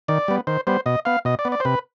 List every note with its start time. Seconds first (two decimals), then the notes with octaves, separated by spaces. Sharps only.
0.08 D#3 D5
0.28 G3 B3
0.47 D#3 C5
0.67 G3 B3 C5
0.86 B2 D#5
1.05 B3 F5
1.25 B2 D#5
1.39 D5
1.45 B3
1.52 D5
1.60 C5
1.65 C3 B4